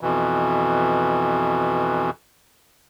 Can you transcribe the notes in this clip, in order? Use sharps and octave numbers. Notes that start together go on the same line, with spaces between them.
F2 B2 E3